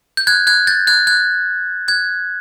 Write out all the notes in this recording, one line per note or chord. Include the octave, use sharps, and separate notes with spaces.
G6
F#6 G#6
F#6 G#6
G6 A6
F#6 G#6
F#6 G#6
F#6 G#6